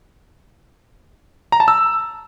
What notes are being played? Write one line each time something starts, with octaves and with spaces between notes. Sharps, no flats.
A#5
A5
E6